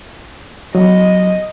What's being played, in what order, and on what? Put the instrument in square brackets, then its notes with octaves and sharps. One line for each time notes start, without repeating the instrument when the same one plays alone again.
[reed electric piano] F#3 [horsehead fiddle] D#5